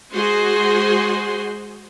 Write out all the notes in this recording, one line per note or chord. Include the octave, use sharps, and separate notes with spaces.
G#3 F#4 G#4 C5 C6